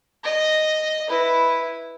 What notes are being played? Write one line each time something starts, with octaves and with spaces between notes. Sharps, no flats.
D#5
E4 B4